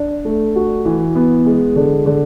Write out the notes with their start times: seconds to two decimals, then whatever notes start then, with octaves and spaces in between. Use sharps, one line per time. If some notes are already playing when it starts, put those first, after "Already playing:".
Already playing: D4
0.25 A3
0.55 F#4
0.85 E3
1.15 B3
1.46 G#3
1.76 D3
2.06 D3